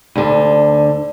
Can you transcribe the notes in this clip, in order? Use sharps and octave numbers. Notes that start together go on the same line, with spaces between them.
D2 D3